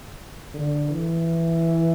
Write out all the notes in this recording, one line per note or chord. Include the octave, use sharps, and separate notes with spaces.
D3
E3